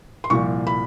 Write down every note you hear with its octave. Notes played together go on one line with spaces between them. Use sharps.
C6
C2 A#2 F3 C#6
B5